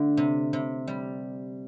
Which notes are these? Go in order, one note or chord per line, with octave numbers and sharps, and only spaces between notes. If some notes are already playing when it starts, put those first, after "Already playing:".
Already playing: D3 A3 D4
C3
C3
G3